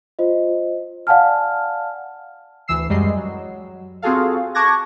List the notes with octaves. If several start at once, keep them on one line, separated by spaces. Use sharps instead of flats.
F4 C5 D#5
D5 F5 F#5 G#5 A5 F6
D2 E3 E6 C7
F#2 G3 G#3 D#5 C7
F#3
C4 F4 F#4 G#4 A4 F5
A5 C#6 D6 F#6 G#6 A#6